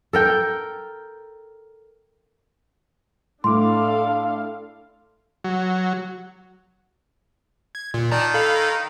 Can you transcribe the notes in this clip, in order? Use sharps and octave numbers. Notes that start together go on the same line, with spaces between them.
A4 A#4 G5
A2 D4 A4 F5 C6 D6
F#3
G#6
A#2
D#3 D5 A5 A#5
A4 F5 B5